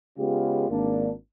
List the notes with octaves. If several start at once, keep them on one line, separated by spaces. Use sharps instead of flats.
C#3 G#3 B3 C#4 F4 G4
G#1 A#3 D4